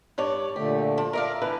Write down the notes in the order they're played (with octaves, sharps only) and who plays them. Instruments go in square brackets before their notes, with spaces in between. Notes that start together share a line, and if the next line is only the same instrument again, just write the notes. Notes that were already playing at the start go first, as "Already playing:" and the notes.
[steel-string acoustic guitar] G2 C#5 D5
[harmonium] A#2 D3 A3 [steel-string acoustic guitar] G4
[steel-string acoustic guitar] F3
[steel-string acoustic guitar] A#4 D5 F5 [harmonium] E5
[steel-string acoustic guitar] D3 E3 B4